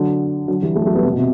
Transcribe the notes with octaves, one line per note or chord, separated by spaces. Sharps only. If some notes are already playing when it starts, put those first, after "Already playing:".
Already playing: D3 F#3
D3 F#3
E3 G3
F#3 A3
F#3 A3
G3 B3
C3
B2
C3